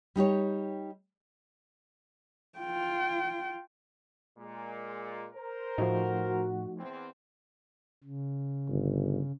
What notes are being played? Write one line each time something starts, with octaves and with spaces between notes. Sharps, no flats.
G3 D#4 G4 C#5
F4 G5
A#2 G#3
A#4 C5
A2 F3 A3 D#4 F#4
E2 C4
C#3
G1